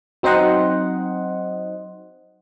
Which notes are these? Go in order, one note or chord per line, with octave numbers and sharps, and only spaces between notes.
F#3 C4 D#4 C5 D#5 F#5